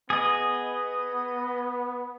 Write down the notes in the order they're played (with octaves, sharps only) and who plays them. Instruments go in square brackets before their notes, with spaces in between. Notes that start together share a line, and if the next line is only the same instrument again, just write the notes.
[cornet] B3 [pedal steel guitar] G#4 D#5